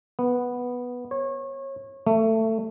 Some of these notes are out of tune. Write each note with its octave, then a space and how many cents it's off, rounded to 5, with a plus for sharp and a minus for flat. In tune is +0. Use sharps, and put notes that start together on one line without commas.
B3 -5
C#5 -30
A3 +20